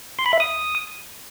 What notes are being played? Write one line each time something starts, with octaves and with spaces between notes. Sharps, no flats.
C6
B5
E5
D#6